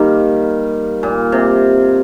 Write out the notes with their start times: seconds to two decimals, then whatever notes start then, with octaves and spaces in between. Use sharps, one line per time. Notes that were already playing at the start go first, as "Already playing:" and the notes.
Already playing: D#3 G3 A#3
1.03 A#2
1.32 C3